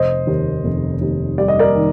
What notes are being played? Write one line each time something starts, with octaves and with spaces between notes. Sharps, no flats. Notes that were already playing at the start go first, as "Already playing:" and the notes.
Already playing: F1 C5 D#5
D#2
F1
D#2
G3 D5
D#5
A#4 D5
D#3